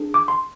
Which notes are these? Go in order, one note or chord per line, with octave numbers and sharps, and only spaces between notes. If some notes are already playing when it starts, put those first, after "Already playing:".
Already playing: D4 G#4
D6
C6